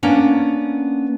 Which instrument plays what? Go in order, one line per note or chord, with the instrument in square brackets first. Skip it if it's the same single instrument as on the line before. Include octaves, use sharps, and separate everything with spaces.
[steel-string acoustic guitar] A#3 B3 C#4 D4